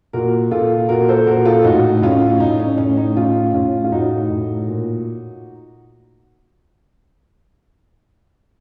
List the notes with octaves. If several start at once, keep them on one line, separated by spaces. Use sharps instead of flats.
A#2 F#4 A#4
A#2 F4 A4
A#2 F#4 A#4
A4 C5
A#2 F#4 A#4
F4 A4
A2 D#4 F#4
A2 C#4 F4
A2 D#4
C#4
A2 C#4
D#4
A2 C#4 F4
A2 C#4 F4
F4
A2 D#4 F#4
A2
A#2